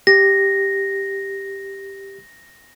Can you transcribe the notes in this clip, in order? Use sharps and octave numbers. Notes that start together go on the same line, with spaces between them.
G4 A#6